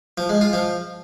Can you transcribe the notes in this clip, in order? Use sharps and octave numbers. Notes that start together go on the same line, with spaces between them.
F3
G#3
F4
F3